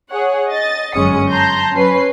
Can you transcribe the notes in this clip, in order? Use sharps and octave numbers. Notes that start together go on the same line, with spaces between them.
G#4 C#5 F#5
D#5 A6
G1 F#2 G#3 C#4 D#6 C#7
A5 A#5 C6 G6 A#6
F#3 C#4 B4 C7